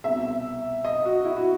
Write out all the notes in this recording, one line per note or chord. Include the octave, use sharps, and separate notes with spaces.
C2 B2 E5
D#5
F#4
E4
F#4